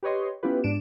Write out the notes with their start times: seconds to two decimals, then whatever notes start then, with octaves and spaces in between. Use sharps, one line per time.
0.03 G4 B4 C#5 D#5 C6
0.43 B3 C#4 E4 F4 G4 B4
0.64 G#2 D4 D7 E7